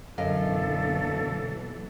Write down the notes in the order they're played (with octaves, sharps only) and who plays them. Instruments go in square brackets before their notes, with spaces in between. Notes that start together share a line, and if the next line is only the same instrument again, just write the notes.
[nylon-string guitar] F#2 D#5 F5 [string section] B2 E3 F#3 [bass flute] D3 [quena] A4